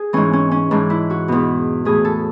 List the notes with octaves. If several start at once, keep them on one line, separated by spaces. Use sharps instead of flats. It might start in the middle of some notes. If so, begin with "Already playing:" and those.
Already playing: G#4
G#2 E3 C#4
C#4
C#4
G#2 E3 D4
E4
F#4
E2 B2
A2 E3 G#4
A4